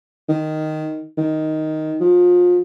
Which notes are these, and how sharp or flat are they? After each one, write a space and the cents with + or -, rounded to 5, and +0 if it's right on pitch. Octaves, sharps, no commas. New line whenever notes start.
D#3 -5
D#3 +5
F3 +30